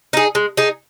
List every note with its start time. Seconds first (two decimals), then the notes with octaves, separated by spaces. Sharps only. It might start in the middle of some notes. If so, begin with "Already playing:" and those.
0.13 D#4 G#4
0.35 G#3
0.57 D#4 G#4